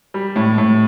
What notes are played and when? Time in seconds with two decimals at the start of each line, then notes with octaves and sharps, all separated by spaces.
0.14 G3
0.36 A2
0.58 A2